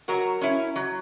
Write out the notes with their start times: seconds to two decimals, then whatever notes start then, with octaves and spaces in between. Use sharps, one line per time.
0.08 F#3 F#4 A#4
0.41 C#4 E4
0.76 F#3